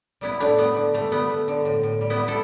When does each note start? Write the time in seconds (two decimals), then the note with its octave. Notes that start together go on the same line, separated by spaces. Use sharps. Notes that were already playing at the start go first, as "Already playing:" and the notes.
0.21 G3 B3 E4
0.40 A2 A3 D4
0.58 G3 B3
0.76 D3
0.94 G3 A3
1.11 G3 B3
1.30 A3
1.48 D3
1.65 A2
1.83 A2
2.01 G3
2.10 B3 E4
2.19 G3
2.28 E4 A4